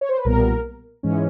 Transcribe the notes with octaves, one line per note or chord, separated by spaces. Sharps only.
C#5
C5
B4
B1 A#2 G3 B3 A#4
G#2 E3 G#3 C#4